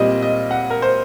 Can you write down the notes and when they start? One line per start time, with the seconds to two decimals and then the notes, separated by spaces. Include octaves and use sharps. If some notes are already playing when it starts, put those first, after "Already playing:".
Already playing: A#2 G3 C4 D#5
0.22 D#5
0.51 F#5
0.70 A#4
0.82 C5